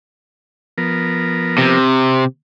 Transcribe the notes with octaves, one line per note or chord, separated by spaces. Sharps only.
F3 B3 A#4
C3